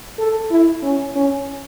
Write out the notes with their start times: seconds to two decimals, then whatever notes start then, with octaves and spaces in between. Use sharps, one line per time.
0.19 A4
0.51 E4
0.83 C#4
1.16 C#4